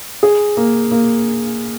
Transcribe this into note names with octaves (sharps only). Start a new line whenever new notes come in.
G#4
A#3
A#3